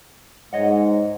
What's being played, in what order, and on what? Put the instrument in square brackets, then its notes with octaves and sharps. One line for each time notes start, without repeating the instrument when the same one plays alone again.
[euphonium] G#2 [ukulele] C#5 D#5 F#5